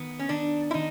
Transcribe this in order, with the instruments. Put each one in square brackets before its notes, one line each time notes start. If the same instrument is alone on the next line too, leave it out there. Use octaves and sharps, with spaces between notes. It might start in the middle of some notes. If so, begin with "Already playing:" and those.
Already playing: [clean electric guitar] D#3 B3
[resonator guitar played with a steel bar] C#4
[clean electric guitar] D#3 [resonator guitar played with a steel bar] D4
[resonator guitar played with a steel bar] E4
[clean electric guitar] D#3 [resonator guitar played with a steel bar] D#4